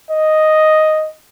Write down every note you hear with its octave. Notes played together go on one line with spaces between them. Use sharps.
D#5